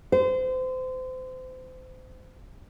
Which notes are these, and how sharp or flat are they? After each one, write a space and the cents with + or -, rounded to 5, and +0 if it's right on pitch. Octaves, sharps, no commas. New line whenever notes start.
C5 -30